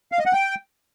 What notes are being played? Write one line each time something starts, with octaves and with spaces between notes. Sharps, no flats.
F5
D#5
F#5
G5